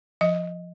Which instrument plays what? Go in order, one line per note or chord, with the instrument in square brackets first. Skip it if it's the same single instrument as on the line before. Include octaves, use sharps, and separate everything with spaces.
[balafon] F3 D#5